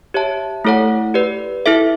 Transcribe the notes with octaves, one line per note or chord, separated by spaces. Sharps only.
G4 C#5 E5 A5
A3 E4 A4 C#5 F#5
G4 B4 D5
E4 A4 E5